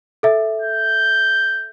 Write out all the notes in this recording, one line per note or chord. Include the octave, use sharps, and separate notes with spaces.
A4 E5
G6